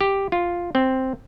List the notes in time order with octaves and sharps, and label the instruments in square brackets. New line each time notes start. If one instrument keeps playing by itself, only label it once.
[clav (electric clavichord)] G4
F4
C4